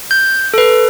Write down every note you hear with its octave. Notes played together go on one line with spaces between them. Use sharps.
G6
A4 B4